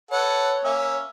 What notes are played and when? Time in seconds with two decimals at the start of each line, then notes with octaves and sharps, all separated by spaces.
0.11 A4 B4 C#5 F#5
0.64 A#3 C#4 E5